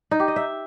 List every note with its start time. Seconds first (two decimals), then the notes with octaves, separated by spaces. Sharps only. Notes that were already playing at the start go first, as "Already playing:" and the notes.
0.11 D#4
0.20 G4
0.28 D#5
0.36 E5